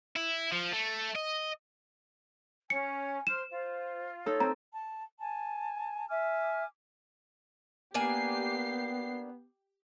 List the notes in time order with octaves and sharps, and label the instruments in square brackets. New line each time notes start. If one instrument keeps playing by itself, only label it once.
[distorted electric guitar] E4
F3
A3
D#5
[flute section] C#4 [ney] G#5 [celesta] C#7
[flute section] C5 C6 F6 [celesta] E7
[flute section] F4 [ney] C5
[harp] D#4 A4 [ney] C#5
[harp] C4 [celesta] A#5
[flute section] A5
G#5 A5
E5 G#5 D6 F6
[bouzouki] A#3 D4 G#5 [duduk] B3 [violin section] G4 C7